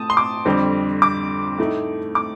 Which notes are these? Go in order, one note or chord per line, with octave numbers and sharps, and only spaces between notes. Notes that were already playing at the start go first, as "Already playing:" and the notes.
Already playing: A2 A3 C4 A5 D#6
C6
D6
F2 D3 G3 C4
D6
A2 A3 D#4
D6